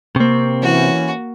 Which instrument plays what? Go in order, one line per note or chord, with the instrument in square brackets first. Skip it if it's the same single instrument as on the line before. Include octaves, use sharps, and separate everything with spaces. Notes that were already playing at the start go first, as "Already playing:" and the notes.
[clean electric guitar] C3 C4 [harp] A#3 C#6
[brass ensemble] E3 C#4 [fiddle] F#4